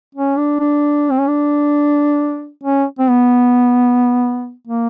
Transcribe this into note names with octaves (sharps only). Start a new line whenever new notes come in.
C#4
D4
D4
C4
C#4
D4
C#4
C4
B3
A#3